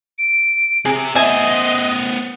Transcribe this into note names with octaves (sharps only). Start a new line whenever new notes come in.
D7
C3 G#4
B3 C5 D#5 E5 G#5